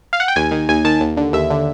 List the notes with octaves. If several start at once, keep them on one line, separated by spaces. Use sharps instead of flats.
F5
F#5
G5
D#2 G#5
D#3
D#2 G#5
D#3 A5
D#2
D3
D#2 E5
D3